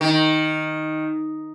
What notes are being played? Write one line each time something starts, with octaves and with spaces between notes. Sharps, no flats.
D#3